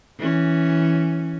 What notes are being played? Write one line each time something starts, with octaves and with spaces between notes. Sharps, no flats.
E3 C#4